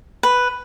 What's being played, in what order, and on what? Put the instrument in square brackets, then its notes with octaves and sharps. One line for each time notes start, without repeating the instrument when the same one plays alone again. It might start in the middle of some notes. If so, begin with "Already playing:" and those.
[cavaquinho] B4